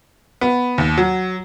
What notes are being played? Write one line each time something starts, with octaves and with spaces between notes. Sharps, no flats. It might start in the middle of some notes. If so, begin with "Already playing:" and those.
B3
D#2
F#3